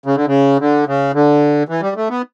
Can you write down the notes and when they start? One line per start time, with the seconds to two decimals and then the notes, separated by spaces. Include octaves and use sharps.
0.06 C#3
0.16 D3
0.27 C#3
0.60 D3
0.87 C#3
1.14 D3
1.69 E3
1.82 G3
1.96 A3
2.10 B3